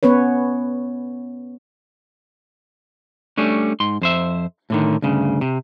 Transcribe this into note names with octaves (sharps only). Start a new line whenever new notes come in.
B3 C#4 B4 C#5
G3 A3 C#4 D4
G#2 C6
F2 C5 E5
A2 D3 D#3
D2 G2 C#3
C3